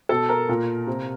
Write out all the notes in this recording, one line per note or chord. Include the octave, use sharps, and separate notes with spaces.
B2 A4 A5
A#4 A#5
A#2
C3